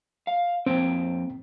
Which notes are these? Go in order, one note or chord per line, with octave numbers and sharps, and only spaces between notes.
F5
F2 A#3 C4 G5